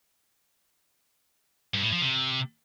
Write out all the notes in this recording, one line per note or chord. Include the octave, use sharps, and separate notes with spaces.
G2
A2
F3
C3